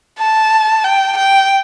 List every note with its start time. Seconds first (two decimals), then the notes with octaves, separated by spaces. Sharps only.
0.19 A5
0.84 G5
1.17 G5